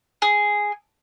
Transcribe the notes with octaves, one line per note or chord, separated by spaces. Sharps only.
G#4